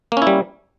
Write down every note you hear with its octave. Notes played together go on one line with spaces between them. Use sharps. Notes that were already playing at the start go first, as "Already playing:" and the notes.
G3 A#3 C#4 E4